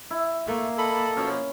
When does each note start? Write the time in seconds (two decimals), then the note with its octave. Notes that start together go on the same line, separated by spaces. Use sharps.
0.11 E4
0.47 A3 A#3
0.78 A4 D#5 A5 B5
1.17 B2 F3 C#4